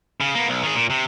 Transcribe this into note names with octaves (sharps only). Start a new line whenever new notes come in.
C#3
A#3 B3
B1
D#3 G#4
A#2
C3